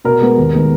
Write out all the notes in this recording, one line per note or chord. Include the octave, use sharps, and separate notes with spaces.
B2 A#4
G#3 B3
D#2
D#3 G#3 B3